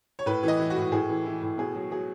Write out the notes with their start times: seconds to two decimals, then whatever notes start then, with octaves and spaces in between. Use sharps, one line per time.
0.19 C#5
0.26 A2 B4
0.43 E3
0.48 D#5
0.59 E3
0.70 F#4
0.76 A2
0.92 A2 G#4
1.09 E3
1.26 E3
1.42 A2
1.58 B2 G#4
1.75 F#3
1.91 F#3 G#4